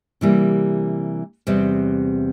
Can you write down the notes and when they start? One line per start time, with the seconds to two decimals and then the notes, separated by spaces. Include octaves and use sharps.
0.21 C3 E3 G3 A#3
1.47 E2 C3 G3 C4